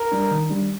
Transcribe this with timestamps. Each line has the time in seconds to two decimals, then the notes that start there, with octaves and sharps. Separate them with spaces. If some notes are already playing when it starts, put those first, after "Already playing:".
Already playing: A#4
0.12 G3 D4
0.31 D#3
0.50 G3 D4